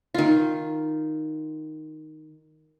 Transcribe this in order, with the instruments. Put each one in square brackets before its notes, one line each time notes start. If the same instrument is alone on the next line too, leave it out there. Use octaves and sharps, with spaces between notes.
[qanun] D#3 F4